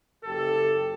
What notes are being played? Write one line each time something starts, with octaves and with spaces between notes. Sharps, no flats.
F#1 G4 A4